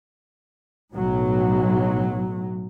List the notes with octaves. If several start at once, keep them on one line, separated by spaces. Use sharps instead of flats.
B1 A2 F#3